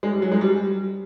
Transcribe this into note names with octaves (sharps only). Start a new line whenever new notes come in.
G#3
G3
F#3
G#3
G3